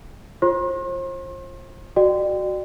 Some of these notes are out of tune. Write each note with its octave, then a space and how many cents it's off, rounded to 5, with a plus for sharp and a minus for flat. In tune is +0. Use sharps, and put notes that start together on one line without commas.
F4 +0 C5 +35 C6 +40
F#4 +0 D5 +30 G5 +0